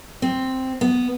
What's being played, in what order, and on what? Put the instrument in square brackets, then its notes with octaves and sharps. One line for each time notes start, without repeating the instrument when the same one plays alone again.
[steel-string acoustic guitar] C4
B3